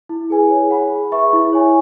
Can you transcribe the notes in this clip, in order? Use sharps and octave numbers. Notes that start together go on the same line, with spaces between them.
E4
G#4 B4 G#5
C#5
F#5 B5
G#4
B4 E5 C#6
E4
C#5 G#5 C#6